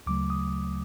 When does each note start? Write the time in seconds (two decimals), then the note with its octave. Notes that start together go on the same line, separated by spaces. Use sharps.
0.07 D2 C#3 F#3 A3 D6
0.30 D#6